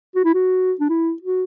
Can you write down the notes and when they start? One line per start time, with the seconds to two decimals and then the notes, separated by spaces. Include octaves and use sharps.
0.16 F#4
0.25 E4
0.34 F#4
0.81 D4
0.89 E4
1.22 F#4